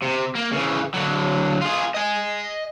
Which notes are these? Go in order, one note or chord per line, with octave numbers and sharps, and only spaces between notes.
C3
A#3
C#3 E3
D3 F#3
F4 G#4
D#5 G#5